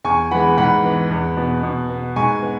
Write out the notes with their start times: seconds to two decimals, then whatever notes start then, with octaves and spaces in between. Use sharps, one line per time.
0.05 E2 G#5 C#6
0.31 E3 G#3 B3 F#5 B5
0.57 G#2 F#5 B5
0.83 E3 B3
1.10 E2
1.37 B2 B3
1.63 B2
1.90 B3
2.16 G#2 G#5 C#6
2.42 B3